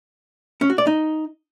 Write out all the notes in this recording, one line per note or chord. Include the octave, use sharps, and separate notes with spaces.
C#4
F#4
D5
D#4